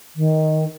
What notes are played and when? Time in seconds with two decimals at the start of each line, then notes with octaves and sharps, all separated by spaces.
0.16 D#3